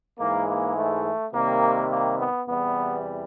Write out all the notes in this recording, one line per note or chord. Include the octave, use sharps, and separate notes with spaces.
G#2 E3 G#3 A#3
A#3
A3
C3 D#3 G3 A#3
A#3
B3
E2 C3 E3 G3 B3